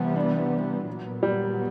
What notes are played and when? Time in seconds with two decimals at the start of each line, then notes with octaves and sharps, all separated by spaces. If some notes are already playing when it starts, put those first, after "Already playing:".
Already playing: C3 E3 G3 B3
0.16 D4
0.87 A#2 F#3 B3
1.23 G3